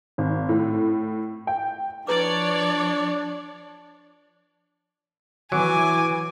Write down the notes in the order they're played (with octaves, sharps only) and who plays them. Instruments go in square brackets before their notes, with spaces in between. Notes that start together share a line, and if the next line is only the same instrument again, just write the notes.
[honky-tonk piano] G#1
A2
G5
[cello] F3 [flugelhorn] D4 [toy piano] E4 B4 D6 [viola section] C#5 D5
[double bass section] E3 [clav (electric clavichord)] F#3 [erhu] G#5 [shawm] D6